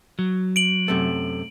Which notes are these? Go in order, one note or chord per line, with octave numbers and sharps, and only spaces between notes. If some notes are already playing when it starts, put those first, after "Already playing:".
F#3
D7 F#7
F#2 C3 A3